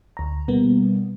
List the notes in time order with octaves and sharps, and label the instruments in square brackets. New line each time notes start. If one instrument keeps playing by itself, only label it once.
[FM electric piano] D2 A#5
B2 G3 A#3 B3